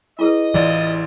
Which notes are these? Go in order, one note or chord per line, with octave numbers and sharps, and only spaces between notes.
E4 G#4 B4 D#5
A1 E3 F4 D5